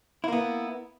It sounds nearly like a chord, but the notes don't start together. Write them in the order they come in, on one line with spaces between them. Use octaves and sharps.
E4 A#3 B3